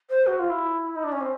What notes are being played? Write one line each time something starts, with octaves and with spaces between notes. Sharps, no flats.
C5
F#4
F4
E4
D#4
D4
C#4
C4